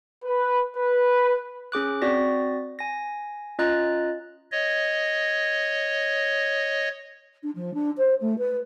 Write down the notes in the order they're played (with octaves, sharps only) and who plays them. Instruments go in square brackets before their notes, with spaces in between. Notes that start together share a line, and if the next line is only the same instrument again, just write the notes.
[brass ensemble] B4
B4
[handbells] C#4 G#4 D6 F#6
C4 F#4 D5 A#6
G#5 A#6
C#4 F4 D#5 A#5 F#6 A6
[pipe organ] C#5 D#5
[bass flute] D4
F3
D4
C5
A3
B4